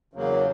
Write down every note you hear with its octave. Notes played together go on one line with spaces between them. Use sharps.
E2 C#3 F#3 A#3